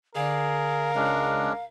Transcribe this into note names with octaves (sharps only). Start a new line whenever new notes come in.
D3 D4 G#4 A#4 F5
C#2 G#3 C#4 D4